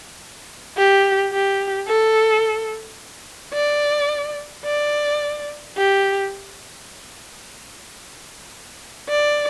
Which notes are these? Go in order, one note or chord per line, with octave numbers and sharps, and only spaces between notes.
G4
G4
A4
D5
D5
G4
D5